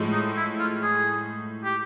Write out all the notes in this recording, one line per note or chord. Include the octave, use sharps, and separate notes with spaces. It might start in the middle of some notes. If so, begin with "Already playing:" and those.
Already playing: A2 F3 G#3
D#4
E4
F4
G#4
G4